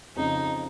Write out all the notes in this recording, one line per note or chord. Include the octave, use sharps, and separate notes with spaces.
F2 C#3 F3 D#4